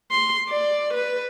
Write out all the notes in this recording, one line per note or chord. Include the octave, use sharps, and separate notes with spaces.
C6
D5
B4